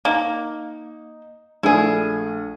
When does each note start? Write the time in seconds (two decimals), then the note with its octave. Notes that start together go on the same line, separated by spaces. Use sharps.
0.05 A#3 D#4
1.63 A#1 A3 D4 E4 G#4